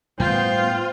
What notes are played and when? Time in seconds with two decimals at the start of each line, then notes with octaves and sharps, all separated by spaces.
0.20 A2 G3 B3 F4 C5 G5